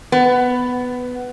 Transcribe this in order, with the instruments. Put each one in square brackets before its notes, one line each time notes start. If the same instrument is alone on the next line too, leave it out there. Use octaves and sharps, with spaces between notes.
[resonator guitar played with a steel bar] B3